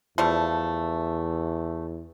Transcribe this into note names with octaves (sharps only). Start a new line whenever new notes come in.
E2 F3 G3 A3